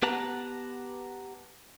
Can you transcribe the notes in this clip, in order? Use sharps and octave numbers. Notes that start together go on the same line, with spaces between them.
B3 G4 B4 F#5 A5 A#5